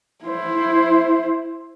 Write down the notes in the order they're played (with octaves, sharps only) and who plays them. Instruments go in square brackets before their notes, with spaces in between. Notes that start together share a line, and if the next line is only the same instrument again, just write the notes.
[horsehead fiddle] E4 C5